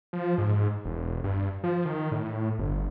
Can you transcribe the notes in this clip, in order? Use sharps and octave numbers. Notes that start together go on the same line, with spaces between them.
F3
G#2
E1
G2
F3
D#3
A2
G1